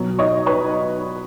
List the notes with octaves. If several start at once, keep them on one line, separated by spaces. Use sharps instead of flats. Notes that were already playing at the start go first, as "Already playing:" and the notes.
Already playing: B2 F#3
C#5 D#5
B4 C#5